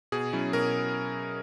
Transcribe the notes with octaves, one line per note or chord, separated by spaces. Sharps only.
B2 G#4
F#3 C#4 E4
B2 A#4